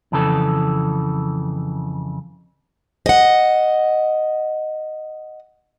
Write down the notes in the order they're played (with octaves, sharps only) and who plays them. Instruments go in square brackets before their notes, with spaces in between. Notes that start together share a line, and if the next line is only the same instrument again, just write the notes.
[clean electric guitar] F2 C#3 E3 A4
[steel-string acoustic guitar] D#5 F#5